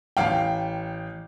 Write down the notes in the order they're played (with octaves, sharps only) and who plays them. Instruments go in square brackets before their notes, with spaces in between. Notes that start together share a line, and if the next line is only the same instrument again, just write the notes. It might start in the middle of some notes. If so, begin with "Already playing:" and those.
[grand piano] A1 F5 G5